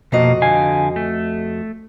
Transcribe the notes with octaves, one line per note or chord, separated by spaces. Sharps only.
F2 B2 A#3 F#4 D#5
D3 F5 G#5
A3